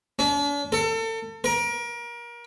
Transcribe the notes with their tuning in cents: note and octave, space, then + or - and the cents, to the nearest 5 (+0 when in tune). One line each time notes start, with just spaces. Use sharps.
D4 -45
A4 +35
A#4 +30